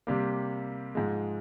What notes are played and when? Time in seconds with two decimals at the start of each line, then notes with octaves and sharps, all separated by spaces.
0.07 C3 G3 A#3
0.95 G#2 F3 G#3